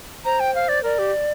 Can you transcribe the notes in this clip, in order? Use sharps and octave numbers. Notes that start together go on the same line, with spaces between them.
C5 A#5
G5
F5
D5
A#4 D5
G4